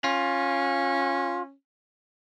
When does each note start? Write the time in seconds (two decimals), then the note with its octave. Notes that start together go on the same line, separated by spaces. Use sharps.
0.04 C#4 F4